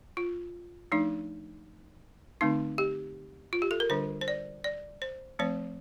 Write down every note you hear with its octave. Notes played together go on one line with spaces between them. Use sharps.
F4
F3 A3 D4 D#4
D3 A3 C4 D#4
G4
F4
G4
A4
A#4
D3 G3 D4 C5
C5
D5
D5
C5
F3 A3 C4 C5